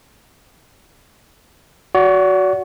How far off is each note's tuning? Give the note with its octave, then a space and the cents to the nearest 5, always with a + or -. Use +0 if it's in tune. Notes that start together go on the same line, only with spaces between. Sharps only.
F#4 +0 D5 -40